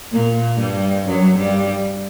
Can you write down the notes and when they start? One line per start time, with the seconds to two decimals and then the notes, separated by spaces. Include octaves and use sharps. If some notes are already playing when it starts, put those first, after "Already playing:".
0.12 A#2 A#3
0.59 G2 G3
1.06 F#2 F#3
1.37 G2 G3